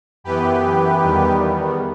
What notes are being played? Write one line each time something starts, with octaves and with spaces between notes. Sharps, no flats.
F#2 E3 B3 G4 B4
E2 D#3 G3 B3